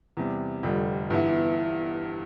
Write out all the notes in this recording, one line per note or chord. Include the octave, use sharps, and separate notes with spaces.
E2 C3 G3
F1 F2 D3 G3
G1 G2 E3 B3 E4